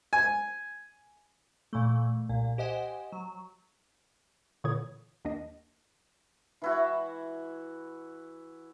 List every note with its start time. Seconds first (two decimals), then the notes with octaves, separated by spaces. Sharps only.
0.13 G#5
1.73 A#2 E3 A3
2.29 C2 A#2
2.58 G4 C5 D#5 F#5 G#5
3.12 F#3
4.64 A#2 D3 E3 C#5 D#6 G#6
5.25 D#2 D4 D#5
6.62 E3 E4 F#4